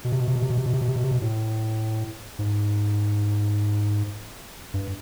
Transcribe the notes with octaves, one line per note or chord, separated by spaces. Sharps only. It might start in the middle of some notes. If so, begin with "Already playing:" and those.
B2
C3
B2
C3
B2
C3
B2
C3
B2
C3
B2
C3
B2
C3
B2
A2
G#2
G2